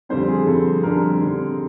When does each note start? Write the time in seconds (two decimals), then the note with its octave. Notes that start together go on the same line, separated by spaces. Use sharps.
0.09 F2 D3 G3 C4 C5
0.28 G#4
0.47 F2 D3 G3 C4 A4
0.83 F2 D3 G3 C4 A#4
1.22 F2 D3 G3 C4